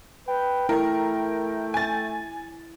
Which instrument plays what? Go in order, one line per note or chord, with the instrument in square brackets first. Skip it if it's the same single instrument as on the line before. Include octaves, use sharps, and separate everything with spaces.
[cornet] B4 [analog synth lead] G5
[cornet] A3 [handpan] E4 [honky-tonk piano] A#4
[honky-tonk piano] G#5 A6